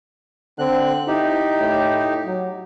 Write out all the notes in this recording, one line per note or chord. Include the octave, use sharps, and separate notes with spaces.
D3 C4 F#6
D#4 E4 G4
A2
F#3